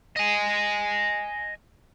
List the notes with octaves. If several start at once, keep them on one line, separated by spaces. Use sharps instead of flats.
D#5 G#5